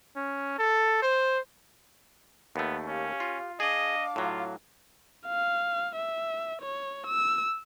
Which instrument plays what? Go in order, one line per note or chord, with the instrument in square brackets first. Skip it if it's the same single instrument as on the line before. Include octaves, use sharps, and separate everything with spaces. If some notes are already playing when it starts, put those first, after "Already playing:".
[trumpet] C#4
A4
C5
[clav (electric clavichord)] D#2 A3 [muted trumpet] B3
[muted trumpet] C#4 [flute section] G4 F5
[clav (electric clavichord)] F4
[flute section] D4 F5 D6 [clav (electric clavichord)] G#4 [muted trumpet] D#5
[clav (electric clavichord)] A2 F#3 [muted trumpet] F4
[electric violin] F5
E5
C#5
E6